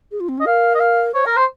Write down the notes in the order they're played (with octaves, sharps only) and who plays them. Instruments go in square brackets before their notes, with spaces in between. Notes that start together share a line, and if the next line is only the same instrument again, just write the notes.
[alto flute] G#4
F4
C4
[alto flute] C#4 [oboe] D#5
[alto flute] A#4 [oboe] F5
[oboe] D#5
F5
[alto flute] C5 [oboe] C#5
[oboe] A#4 [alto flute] A#5
[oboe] C5